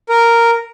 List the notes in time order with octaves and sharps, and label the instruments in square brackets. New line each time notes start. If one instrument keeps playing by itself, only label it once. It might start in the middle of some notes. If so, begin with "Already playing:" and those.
[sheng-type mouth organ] A#4